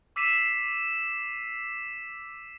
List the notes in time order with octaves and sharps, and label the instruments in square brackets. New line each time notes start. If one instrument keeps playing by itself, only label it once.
[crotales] D6 E6 B6 C7 D#7 E7